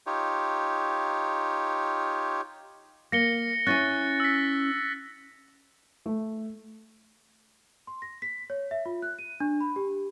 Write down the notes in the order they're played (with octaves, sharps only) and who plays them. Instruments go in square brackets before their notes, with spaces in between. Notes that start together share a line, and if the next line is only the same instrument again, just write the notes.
[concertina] D#4 F4 G4 C#5
[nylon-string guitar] A#3 [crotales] A#6 C#7 G7
[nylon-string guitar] C#4 E4 G#5 [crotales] F#6 A6
[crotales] E6 B6
[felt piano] A3
[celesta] C6
A#6
B6
C#5
E5
F4
F#6
D#7
D4
B5
G4